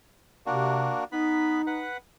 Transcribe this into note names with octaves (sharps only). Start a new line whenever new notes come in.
C3 A#3 D4 F#4
B3 D#4 B4 B5
B4 F#5